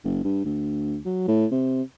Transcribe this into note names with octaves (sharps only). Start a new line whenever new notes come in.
F#1
G2
D2
F#3
A2
C3